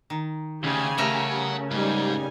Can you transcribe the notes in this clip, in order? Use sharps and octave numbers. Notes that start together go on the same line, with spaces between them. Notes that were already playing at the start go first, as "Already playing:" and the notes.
D#3
D2 C#3 G4 G#5
A3 C#4 A#4 F#5 A#5
G#2 G3 D#4 G#5